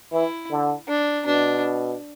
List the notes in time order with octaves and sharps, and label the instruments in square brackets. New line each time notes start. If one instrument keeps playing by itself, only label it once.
[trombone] E3 [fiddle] E4
[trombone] D3
[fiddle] D4
[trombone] B2 [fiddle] D4